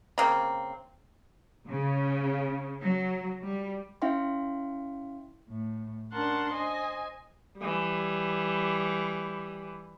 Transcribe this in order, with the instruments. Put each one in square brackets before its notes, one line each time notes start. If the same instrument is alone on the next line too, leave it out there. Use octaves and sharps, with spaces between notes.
[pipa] C#3 A#3 C4
[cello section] C#3
F#3
G3
[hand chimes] C#4 E4 E5 F5 G5 C6
[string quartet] A2
C#4 D4 A#4 F#5 A5 C6
C5 D#5 G#5
[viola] E3 G3